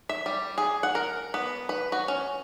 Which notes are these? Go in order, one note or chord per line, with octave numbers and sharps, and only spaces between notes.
E5
G3
G#4
F#5
A#4
B3
B4
F#4
C#4